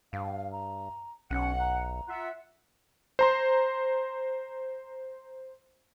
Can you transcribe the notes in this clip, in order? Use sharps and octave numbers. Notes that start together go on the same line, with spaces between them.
G2 F5
A#5
B1 C#4 F#5
A#5
F4 E5 F#5
C5 A#5 C6